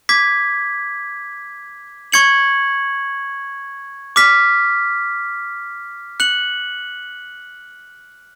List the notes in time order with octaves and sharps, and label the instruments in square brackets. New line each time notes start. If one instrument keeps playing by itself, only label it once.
[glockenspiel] D6 G#6 B6
C#6 G#6 C#7 F#7
D6 F6 B6
F#6 C#7 F#7